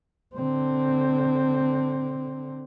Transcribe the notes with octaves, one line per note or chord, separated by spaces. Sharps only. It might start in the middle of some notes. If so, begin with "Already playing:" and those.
D3 C4